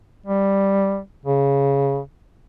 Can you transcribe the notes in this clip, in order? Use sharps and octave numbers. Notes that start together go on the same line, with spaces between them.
G3
C#3